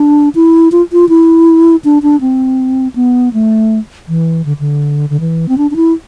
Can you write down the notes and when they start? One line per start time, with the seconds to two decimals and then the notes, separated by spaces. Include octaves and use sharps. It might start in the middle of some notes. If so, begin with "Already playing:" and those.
Already playing: D4
0.35 E4
0.72 F4
0.92 F4
1.09 E4
1.85 D4
2.03 D4
2.21 C4
2.96 B3
3.33 A3
4.08 E3
4.45 D3
4.60 D3
5.10 D3
5.20 E3
5.49 C4
5.58 D4
5.71 D4
5.76 E4